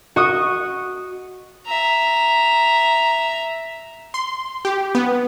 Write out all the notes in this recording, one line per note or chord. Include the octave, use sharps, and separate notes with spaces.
F#4 D#5 C#6 D#6
E5 A#5
C6
G4
B3